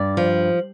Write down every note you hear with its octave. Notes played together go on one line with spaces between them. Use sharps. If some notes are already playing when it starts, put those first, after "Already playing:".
Already playing: G2 D5
F3